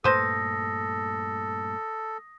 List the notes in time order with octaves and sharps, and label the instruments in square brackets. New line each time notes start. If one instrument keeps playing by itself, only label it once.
[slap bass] G2 A#2 A3 [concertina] A4 [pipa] B4 C5 [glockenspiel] D#6 A#6